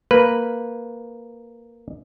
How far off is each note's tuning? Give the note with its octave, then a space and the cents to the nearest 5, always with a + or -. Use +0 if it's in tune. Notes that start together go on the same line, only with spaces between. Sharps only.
A#3 +0 B4 +0